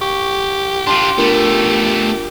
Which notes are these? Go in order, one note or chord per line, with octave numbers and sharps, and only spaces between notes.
G4 C#6
D4 F4 C6
A3 B3 D4 F4 A#4